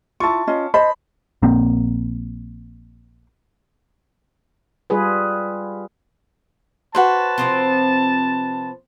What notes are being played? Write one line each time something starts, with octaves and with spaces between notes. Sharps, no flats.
E4 F4 A5 C#6
C#4 F4 D#5
C5 D#5 A5 B5
A#1 A#3 C4
G3 F4 G#4 B4
F#4 B4 C5 A5
C3 F3 C4